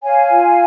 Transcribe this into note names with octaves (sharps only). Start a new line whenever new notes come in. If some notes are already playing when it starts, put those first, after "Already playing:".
C#5 F5 G#5
F4